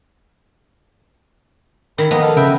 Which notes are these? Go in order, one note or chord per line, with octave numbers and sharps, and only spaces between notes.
D#3 E4 B5
F3 A#3 B3 D#5
A4 F5
C#3 B4 E5 G5